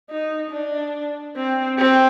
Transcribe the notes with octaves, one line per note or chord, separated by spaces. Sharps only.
D#4
D4
C4
C4